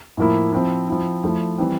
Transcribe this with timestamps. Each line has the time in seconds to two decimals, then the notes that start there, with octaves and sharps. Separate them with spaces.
0.17 A2 F3 A#3 E4
0.53 F3 C4 E4
0.88 F3 C4 E4
1.24 F3 A3 E4
1.58 E3 G3 C4